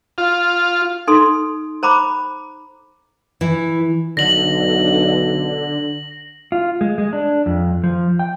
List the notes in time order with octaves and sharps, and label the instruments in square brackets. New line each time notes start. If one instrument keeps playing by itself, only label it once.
[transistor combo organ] F4
[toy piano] D#4 A4 C6
C5 A#5 B5 D6
[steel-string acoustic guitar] E3
[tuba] B1 [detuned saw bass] D3 [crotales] A#6 F#7
[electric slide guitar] F4
G#3
G#3
D4
F2
F3
G5